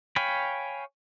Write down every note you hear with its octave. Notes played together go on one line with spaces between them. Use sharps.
C#5 F5 G5 G#5 B5